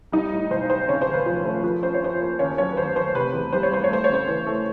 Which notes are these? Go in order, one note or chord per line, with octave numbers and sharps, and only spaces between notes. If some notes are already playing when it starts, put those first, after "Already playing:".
G3 D#4 D#5
A2
B1 C5
B1 C5
C#3 C#4 C#5
C5
D#2
B4
F3 C5
A3 C5
F3 B4
C#4 C5
C#5
C#4 C5
A#3
D#2 C#4 C#5
F#3 C#4 C#5
B4
D#2 C5
D#2 C5
C3 B4
E2
G3 C5
C#5
G3 C5
C#5
A3 C5
C#5
C#3 C5
E3
A3